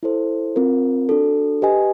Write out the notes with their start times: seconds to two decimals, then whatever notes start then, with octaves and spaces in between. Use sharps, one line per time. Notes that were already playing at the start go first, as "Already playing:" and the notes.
0.03 E4 A4 C5
0.56 C4 F4 A#4
1.09 D4 F#4 A4
1.62 G4 B4 D#5 G#5